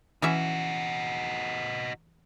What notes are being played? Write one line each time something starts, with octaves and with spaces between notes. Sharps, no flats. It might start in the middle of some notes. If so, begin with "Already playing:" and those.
E3 C#4 D#4 F#4 E5